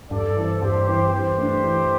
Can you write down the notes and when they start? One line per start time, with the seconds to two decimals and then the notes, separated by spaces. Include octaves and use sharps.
0.11 G2 A4 D5
0.36 E3 C4
0.62 G2 G4 C5
0.87 E3 C4
1.13 E3 G4 C5
1.38 A3 D4
1.64 E3